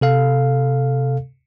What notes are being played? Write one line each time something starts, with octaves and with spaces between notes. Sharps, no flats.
C3 A4 F5